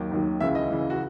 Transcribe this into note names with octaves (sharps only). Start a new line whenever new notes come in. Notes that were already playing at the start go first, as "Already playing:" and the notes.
Already playing: D#2 D#3 F#3
D#2 D#3 F#3
C#2 C#3 E3 E5
D#5
C#2 C#3 E3
F#4